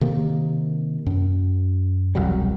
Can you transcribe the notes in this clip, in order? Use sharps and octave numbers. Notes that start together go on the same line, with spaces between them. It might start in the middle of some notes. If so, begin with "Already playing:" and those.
C3 D#3 A#3
F#2
E1 C2 F#3 G3